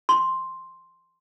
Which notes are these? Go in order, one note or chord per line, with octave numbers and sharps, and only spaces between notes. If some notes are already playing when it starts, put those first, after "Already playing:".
C6